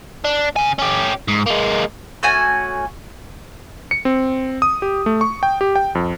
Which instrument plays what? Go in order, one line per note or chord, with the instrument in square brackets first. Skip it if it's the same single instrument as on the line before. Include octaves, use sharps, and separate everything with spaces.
[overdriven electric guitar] D4
C#3 G#5
C#4 G4
G#2
G#3 A#3
[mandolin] A3 C#4 F#4 G#5
[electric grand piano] C#7
C4
D#6
G4
A3
C#6
G5
G4
G5
F2